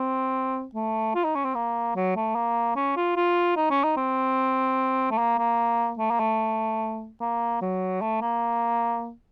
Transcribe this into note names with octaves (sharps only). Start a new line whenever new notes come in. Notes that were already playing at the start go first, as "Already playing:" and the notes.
Already playing: C4
A3
F4
D#4
C#4
C4
A#3
F#3
A3
A#3
C#4
F4
F4
D#4
C#4
D#4
C4
A3
A#3
A#3
A3
A#3
A3
A#3
F#3
A3
A#3